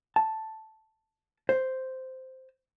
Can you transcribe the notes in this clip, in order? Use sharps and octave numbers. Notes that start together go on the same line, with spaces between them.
A5
C5